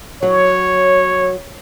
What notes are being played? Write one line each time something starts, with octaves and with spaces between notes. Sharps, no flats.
F#3 C#5